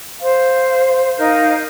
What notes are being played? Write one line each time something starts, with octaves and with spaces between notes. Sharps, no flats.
C5 F5
D#4 A#4 F5 G6